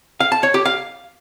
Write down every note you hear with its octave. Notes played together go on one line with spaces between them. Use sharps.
F5
A5
C#5
G4
F5